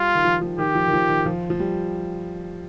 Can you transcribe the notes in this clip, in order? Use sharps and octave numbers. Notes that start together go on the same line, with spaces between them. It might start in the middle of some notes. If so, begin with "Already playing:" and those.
Already playing: G3 F4
D#3
F3
F3
D#3 G4
F3
D#3
F3
D#3
F3
F3
G3